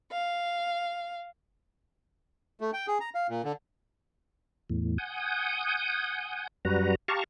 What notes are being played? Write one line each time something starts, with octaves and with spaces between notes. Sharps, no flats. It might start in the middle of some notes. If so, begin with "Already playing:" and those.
F5
A3
G5
G#4
A#5
F5
A#2
D3
E2 A2
F#5 G#5 D#6 G6
F#2 G3 F#4 B4 A#5
G4 F5 A5 A#5 C#6